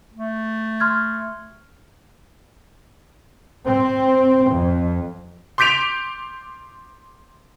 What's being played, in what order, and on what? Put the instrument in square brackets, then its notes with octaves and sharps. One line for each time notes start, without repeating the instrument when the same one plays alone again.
[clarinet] A3
[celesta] C6 F6 G#6
[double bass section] C4
F2
[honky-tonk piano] C6 D6 G6 B6 D7 F7